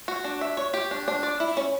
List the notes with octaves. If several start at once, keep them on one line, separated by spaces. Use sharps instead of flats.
F#4
D4
E5
C#5
G4
D4
D4
D5
E4
C#4